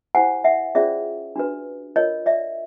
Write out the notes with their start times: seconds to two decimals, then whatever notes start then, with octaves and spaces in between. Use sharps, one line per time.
0.15 E4 G4 C5 F#5 G#5
0.44 E5 F#5
0.75 C#4 F4 G#4 C5 D5 E5
1.36 D4 F#4 B4
1.96 F4 A#4 C#5 D#5
2.26 D5 E5